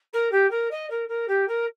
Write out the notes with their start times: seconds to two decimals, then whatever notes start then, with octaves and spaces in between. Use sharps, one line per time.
0.13 A#4
0.31 G4
0.50 A#4
0.71 D#5
0.90 A#4
1.08 A#4
1.28 G4
1.48 A#4